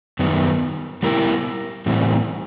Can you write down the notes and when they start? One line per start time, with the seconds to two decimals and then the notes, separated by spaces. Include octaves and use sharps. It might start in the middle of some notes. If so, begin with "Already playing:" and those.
0.19 F#2 D#3 G3 B3
1.03 G3 B3 E4 G4 A#4
1.86 A2 E3 G3 C4